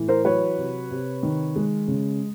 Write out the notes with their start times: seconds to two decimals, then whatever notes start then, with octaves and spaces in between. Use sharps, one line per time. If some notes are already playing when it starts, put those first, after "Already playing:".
Already playing: A2 E3
0.08 A#4 C5
0.25 F#3 B4 C#5
0.58 C3
0.91 C3
1.23 D#3
1.56 G#3
1.88 C#3